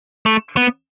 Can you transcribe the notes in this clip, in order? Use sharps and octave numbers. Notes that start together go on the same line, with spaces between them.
A3
B3